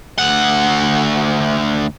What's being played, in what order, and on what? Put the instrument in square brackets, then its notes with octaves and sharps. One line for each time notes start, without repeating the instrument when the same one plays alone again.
[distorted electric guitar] D2 F#5